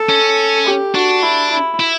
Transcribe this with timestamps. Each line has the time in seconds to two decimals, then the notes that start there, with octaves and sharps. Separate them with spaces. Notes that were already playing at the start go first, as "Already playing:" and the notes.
Already playing: A4
0.09 C#4
0.66 G4
0.95 D4 F#4
1.23 E4
1.51 E4
1.80 E4